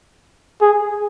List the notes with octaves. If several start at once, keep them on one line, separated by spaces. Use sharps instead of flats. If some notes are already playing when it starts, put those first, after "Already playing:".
G#4